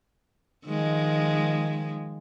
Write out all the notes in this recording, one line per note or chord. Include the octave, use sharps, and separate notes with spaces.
D#3 F3 G#3